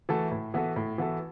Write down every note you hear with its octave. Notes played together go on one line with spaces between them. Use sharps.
E3 A3 F#4 A4
A2
E3 B3 F#4 A4
A2
E3 B3 F#4 A4